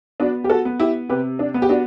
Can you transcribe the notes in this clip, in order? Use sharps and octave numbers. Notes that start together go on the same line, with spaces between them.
B3 D4 F#4
G4
F#4 A4
B3
E4 G4
C3 G4 B4
D4
B3
G4
D4 F#4